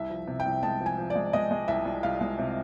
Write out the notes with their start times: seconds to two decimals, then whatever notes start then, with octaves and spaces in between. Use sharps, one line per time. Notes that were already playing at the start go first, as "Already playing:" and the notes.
Already playing: C2 E5
0.10 F3
0.27 C3
0.40 G5
0.45 C2
0.63 G#3 A5
0.80 F3
0.86 G#5
0.98 F3
1.10 D5
1.15 G#3
1.33 G#3 D#5
1.51 G#3
1.68 C2 E5
1.86 C2
2.03 C2 F5
2.21 G#3
2.39 C3